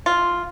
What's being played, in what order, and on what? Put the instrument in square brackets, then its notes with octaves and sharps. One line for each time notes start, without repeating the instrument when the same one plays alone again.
[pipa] F4